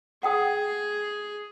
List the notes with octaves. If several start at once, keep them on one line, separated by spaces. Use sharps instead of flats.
G#4 F#5 G5 D#6